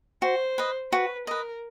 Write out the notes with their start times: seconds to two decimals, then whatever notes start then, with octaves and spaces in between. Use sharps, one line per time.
0.22 F#4 C5
0.58 B4 D#5
0.92 F#4 B4
1.27 A#4 B4 D#5